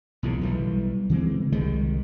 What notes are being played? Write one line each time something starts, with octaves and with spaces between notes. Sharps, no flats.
B1 E2 A#2 C#3
B1 E3 G3
C#3 E3 G#3 C4
C2 D#3 G3 G#3